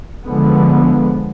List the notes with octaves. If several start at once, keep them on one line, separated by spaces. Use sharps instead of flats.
D3 F3 G#3 B3